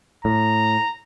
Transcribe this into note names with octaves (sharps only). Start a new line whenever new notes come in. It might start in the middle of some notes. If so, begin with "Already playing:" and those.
A2 A#5